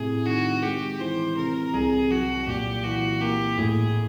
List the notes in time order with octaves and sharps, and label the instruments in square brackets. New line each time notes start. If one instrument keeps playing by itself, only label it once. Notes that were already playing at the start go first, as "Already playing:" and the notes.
Already playing: [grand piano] A2 C3 [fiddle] G#4
[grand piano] D#3 [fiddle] F#4
[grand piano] G#3 [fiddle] G4
[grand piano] E3 [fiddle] C5
[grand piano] C3 [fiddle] A#4
[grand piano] C2 [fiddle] G#4
[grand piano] F#3 [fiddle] F#4
[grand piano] A#2 [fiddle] G4
[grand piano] E3 [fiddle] F#4
[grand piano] A#3 [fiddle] G4
[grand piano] A2 [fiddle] G#4